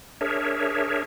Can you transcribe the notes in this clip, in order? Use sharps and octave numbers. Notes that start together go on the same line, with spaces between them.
D4 G#4 A#4 C#5 E5